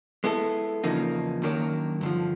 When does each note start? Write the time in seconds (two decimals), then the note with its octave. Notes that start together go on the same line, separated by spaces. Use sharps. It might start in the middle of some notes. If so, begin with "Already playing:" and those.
0.24 G#3 B3 E4 A4
0.84 E2 C#3 F3 A#3 D#4
1.42 F#2 D#3 F#3 A#3 D4
2.01 G2 D3 F3